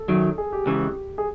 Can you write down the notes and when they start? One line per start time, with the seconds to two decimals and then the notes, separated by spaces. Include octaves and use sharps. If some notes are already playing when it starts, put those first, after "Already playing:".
Already playing: A4
0.08 F#2 D#3 F#3
0.38 G#4
0.53 G4
0.66 C#2 C#3 E3
1.18 G#4